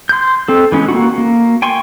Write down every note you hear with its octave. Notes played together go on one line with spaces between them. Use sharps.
C6 G6
C4 A4
E3 G#3 C#4
A#3 D4 F#4
A#3
G5 G#5 C6 C#6